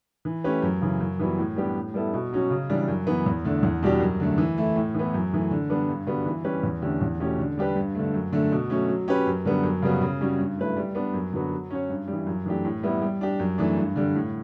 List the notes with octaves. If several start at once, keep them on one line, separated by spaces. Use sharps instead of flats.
E3
A3 C#4 G4 B4
F#2
C#3 E3
F#2
E3 G3 B3 F#4
A2
G3 B3 D4 G4
A2
G3 B3 E4 A4
B2
F#3 C#4 F#4
C#3
E3 G3 D4
F#2
E3 B3
E2
D3 A3
E2
B2 G3 D4 G4
F#2
D3 A3
E3
A3 E4
A2
E3 B3
F#2
E3 A3
D3
G3 B3 D4
G2
D3 G3 B3 F#4
E3
G3 C#4 G4 B4
E2
D3 A3 C#4 G4
E2
B2 A3 C#4 G4
D3
G3 D4 G4 B4
G2
D3 A3
F#2
D3 A3
B2
F#3 A3 C#4
F#3
C#4 G4 B4
F#2
D3 G3 B3
F#2
C#3 G3 B3 F#4
C#3
G3 C#4 F#4
G2
F#3 A3 E4 B4
G3
B3 D4
F#2
D3 F#3 B3 F#4
F#3
C#4 F#4 C#5
G2
G3
E3
F#2
E3 A3 D4 G4
A2
G3 B3 E4
G3
D4 G4
F#2
E3 A3 D4
G2
D3 G3
A2